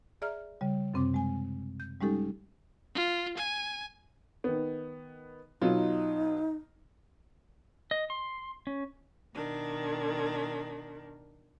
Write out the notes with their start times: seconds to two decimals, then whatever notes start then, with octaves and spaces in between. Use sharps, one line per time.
0.22 G#4 D5 E5 A#5 F6
0.61 C#3 G3
0.94 F#2 C3 C4 C6 D6
1.14 G#3 G#5
1.80 G6
2.01 G3 G#3 C#4 D#4 G4 A4
2.95 F4
3.37 G#5
4.44 D#3 B3
5.62 B2 F#3 D#4 F4
7.91 D#5
8.10 C6
8.67 C#4
9.33 B2 D#3 D4